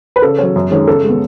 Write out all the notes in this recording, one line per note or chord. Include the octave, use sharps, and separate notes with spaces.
B4
C#3 A4
F#3 C#4
F#2
D#3 G#3 C#4
C#3 A4
G#3 B3